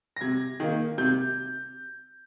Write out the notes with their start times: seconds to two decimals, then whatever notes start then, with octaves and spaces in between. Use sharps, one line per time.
0.16 A#6
0.21 C3 G#6
0.60 D#3 A#3
0.98 C3 G6